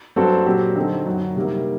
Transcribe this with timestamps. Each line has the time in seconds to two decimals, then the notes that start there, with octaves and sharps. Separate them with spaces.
0.16 G2 F#3 C4 F#4 A4
0.46 A#2 F#3 C4 G4
0.76 D3 F#3 C4 D#4 A4
1.06 F#2 D3 F#3
1.36 C3 D#3 G3 A#3